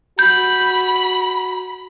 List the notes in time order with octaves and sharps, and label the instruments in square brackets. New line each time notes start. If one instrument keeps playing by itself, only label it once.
[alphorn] F#4 [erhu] B5 [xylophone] G6